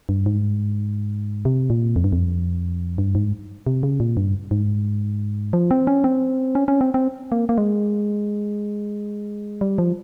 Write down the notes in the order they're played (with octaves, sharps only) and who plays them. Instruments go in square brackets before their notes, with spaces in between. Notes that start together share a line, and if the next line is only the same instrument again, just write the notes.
[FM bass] G2
G#2
C3
A#2
F2
G2
F2
G2
G#2
C3
C#3
A#2
G2
G#2
F3
C4
C#4
C4
C#4
C#4
C4
C4
A#3
A#3
G#3
G3
F3